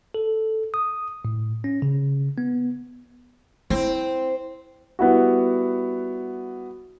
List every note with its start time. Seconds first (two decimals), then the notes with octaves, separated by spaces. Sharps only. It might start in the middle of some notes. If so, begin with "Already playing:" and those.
0.14 A4
0.74 D#6
1.25 A2
1.64 C#4
1.82 C#3
2.38 B3
3.70 C4 E4
4.99 G3 B3 E4 F#4